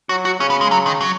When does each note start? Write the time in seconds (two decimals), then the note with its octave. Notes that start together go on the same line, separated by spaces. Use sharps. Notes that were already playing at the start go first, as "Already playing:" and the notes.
0.09 F#3 F#4
0.25 F#4
0.40 C#3 C#4
0.50 B3
0.61 G#3
0.71 F#3
0.86 D#3
1.01 F#3